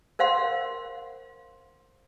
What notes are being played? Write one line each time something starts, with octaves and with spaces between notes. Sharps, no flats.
A#4 C5 F5 F#5 C6